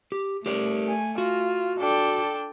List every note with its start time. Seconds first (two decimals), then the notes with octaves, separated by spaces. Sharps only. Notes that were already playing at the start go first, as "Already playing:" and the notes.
0.12 G4
0.46 A3 G4 A#4 D5
0.87 G#5
1.18 F4 F#4
1.79 D4 A4 G5